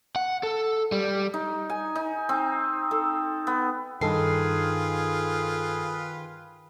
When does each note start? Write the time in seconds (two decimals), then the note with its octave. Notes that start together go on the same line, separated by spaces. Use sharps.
0.16 F#5
0.43 A4
0.92 G3
1.34 D#4
1.70 G#5
1.95 D#4
2.29 C4
2.91 A4
3.47 B3
4.01 G2 D#3 F4 G#4 A4 B4 C7